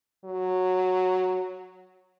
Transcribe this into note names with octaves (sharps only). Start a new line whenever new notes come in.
F#3